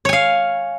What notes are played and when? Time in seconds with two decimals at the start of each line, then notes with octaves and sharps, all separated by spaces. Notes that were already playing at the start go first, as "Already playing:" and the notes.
0.05 C#5
0.09 G#5
0.13 F5